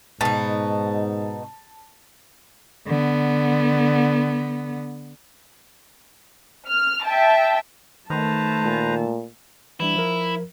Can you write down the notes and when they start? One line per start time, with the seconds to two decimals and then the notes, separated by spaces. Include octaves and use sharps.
0.21 G#2 B2 D#4 A5 A6
2.87 D3 B3
6.69 F6
7.06 E5 G5 A5
8.10 D#3 A3 B4 C5 A5 A#5
8.65 A#2
9.80 E3 G3 D4 E4
9.95 F3 A#4